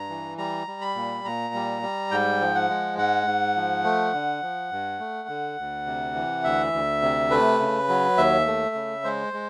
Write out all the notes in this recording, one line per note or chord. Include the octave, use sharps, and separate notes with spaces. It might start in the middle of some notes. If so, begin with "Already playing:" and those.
Already playing: G2 A#5
E3
G3 A#5
G3
B5
A#2
A#2 A#5
G3
G3
G#2 G5
F3
F#5
G#3
G#2 F#5
G#2
F3
A3
D3
F3
G2
A3
D3
D2
C3
E3
D2 E5
D2
C3
A3 B4
C#3
F#3
D#2 E5
A3
C#3
G#3 C5
G#3